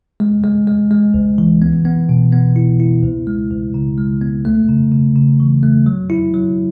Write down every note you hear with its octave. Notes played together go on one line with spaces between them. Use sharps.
G#3
G#3
G#3
G#3
C#2
E3
B3
B3
B2
B3
E4
E4
C#2
G#3
C#2
C#3
G#3
B3
A3
C#3
C#3
C#3
E3
A3
F#3
E4
F#3